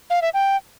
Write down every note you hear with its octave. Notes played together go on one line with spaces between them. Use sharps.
F5
E5
G5